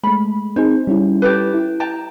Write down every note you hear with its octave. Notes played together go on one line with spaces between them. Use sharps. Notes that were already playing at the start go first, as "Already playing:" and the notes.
G#3 A3 B5
C4 D#4 G#4 C5
G3 C#4 E4
G4 A4 B4
E4
G5 A5 A#5